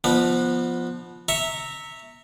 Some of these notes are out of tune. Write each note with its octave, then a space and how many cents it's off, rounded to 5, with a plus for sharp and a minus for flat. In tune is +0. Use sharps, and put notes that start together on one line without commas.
F3 +0 B3 -15 D#4 -45
E5 -10 A#5 -20 C#6 +0